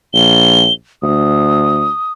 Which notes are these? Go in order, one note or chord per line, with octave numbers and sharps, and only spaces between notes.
A#1 G7
D2 D#6